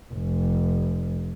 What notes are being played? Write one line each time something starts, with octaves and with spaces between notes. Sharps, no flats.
F1